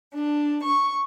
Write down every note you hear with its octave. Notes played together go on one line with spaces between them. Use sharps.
D4
C#6